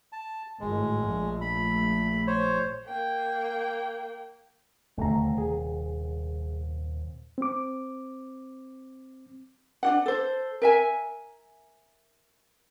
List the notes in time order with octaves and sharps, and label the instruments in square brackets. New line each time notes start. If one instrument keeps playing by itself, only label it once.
[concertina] A5
[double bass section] G#1 A2 [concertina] G#3
[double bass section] A#1 A3
[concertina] B5
C5 C#5
[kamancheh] A#3 G5
[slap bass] D#1 C3 [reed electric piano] D2 A3 A#5
[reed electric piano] G#4
C4 D6
[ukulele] D4 F#4 F#5
A4 C5
A#4 E5 G#5